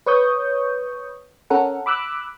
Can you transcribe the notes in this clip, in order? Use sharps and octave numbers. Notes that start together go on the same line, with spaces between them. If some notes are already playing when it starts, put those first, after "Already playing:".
B4 C#5 C#6 D#6 G6
C#4 A4 A#4 F#5
B5 D6 E6 F#6